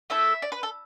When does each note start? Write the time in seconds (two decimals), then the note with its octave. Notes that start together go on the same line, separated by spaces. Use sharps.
0.10 A3 E4 A4 E5
0.42 D5
0.52 B4
0.63 A4